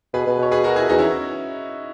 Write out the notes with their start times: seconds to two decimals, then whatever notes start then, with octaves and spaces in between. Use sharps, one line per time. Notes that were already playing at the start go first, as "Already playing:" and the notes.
0.13 B2 G#4 B4
0.27 B2
0.39 B2 C#5
0.51 G#4 B4
0.64 F#4 A#4
0.76 E4 G#4
0.89 E2 D#4 F#4
0.99 C#4 E4